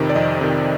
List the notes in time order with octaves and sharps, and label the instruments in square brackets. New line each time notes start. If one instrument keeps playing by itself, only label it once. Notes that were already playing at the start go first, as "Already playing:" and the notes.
Already playing: [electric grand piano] F2 C3 D#3
D5
F2 D#5
C3 D#3